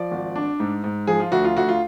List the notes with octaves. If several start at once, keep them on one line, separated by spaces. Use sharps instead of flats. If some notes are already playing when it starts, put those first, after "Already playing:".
Already playing: F3 D5
G#1
D4
G#2
G#2
F3 G#4
F4
D2 F#4
F4
D2 F#4
F4